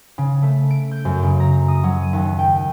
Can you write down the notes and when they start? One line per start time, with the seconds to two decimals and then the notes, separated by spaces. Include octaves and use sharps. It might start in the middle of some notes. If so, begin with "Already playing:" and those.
0.18 C#3
0.43 A3
0.71 D7
0.91 G6
1.05 F#2
1.23 C#3
1.40 A#5
1.68 D#6
1.84 F#3
2.01 D#7
2.13 D#2
2.39 G5